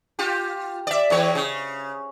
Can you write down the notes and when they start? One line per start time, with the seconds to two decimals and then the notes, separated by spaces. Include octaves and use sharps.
0.19 F4 G4
0.87 D5 E5
1.10 E2 E3 C#5
1.35 C#3